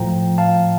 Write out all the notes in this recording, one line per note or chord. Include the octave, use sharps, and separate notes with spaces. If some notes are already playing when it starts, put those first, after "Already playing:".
Already playing: A2 F3 G5 A#5
F5 A5